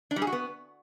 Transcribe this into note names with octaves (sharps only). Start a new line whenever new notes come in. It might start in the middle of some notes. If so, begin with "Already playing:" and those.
D4
G3
G#4
F#4
B3